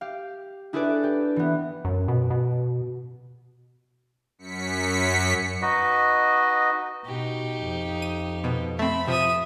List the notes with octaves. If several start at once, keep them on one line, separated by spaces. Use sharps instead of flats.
G4 F5
D4 E4 G#4 A4 B4 D5
G4
E3 B3
F#2
B2
B2
F#2 B6 C#7
D#4 F#4 B4 D#5
B2 D#4 G4
F2
D#7
B2
A3 C4 E5 B5
C3 F3 E5 D#6